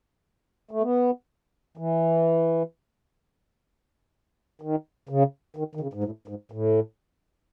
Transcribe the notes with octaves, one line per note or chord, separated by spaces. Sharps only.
A3
B3
E3
D#3
C#3
D#3
D#3
C#3
G#2
A2
G#2
A2